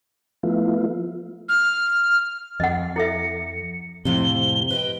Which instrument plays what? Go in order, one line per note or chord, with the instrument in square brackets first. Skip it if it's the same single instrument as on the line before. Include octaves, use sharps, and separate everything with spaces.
[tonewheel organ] F3 A3 B3 E4 F4
[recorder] F6
[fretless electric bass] F2 [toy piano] D#5 F#5
[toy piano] E4 A4 E5 [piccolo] C#7
[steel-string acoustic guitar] F2 A2 [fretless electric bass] C3 [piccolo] G7
[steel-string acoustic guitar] B4 D#5 G5